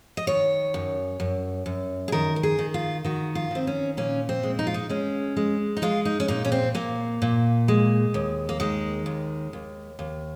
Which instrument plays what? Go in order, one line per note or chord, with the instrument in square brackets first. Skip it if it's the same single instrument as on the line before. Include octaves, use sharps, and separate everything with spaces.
[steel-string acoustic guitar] D#5
D#3 C#5
F#2
F#2
F#2
G#4
D#3 A#4
A#4
G#4
D#3
F4
D#3 F#4
F4
D#3 C4
C#4
A#2 C#4
C4
G#3
D#4
F4
D#4
G#3 C#4
G#3
D#4
G#3 F4
D#4
C#4
A#2 D#4
C#4
C4
A#2 A#3
A#2
G#3
D#2
A#3
D#3 G#3
D#2
D#2
D#2